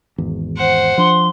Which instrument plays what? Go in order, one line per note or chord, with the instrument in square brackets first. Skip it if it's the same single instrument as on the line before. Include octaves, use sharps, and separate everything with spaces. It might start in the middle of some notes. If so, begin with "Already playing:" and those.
[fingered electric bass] G#1 E2
[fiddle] C5 F#5
[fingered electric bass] F3 D4 [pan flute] C6